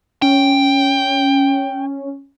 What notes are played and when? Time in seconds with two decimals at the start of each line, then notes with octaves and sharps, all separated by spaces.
0.22 C#4 G5